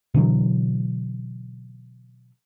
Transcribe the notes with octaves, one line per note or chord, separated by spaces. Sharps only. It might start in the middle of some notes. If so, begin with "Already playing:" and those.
B2 D3 E3 F#3